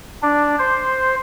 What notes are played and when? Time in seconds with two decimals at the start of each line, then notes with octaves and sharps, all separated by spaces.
0.22 D4
0.59 C5